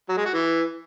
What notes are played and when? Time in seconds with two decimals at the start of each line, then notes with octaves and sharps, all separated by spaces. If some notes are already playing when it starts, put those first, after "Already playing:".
0.09 F#3
0.17 G#3
0.26 F#4
0.34 E3